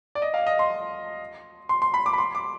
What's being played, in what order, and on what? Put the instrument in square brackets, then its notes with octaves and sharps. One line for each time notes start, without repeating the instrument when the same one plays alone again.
[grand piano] D5
D#5
F5
D#5
C6
C6
C6
B5
D6
B5
C6
D6